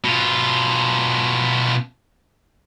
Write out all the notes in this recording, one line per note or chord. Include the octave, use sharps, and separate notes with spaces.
B2 F4